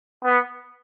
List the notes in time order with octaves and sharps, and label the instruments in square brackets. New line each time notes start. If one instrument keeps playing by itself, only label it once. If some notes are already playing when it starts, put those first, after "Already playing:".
[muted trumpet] B3